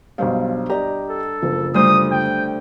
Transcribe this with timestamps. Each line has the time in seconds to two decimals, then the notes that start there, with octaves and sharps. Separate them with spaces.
0.18 B1 G2 C5 F5
0.70 G4 D5 D#5 A#5
1.10 A4
1.42 F#1 F3
1.74 D2 G3 C5 D#6
2.11 G5